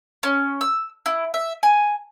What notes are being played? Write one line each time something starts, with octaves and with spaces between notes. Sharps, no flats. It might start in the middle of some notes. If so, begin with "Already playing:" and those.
C#4
E6
E4
E5
G#5